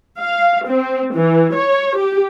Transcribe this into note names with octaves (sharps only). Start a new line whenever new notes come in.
F5
C4
E3
C#5
G4